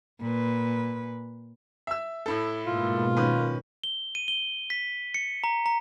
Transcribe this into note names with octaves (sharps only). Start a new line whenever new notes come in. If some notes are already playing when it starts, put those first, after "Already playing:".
A#2 B4
E5 E6
A2 E4 A4
G#2 B2 A#3 F4
D#3 C#4 B4
G7
D#7
G7
B6
C#7
A#5
A#5